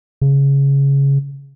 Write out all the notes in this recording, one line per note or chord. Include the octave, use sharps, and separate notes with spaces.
C#3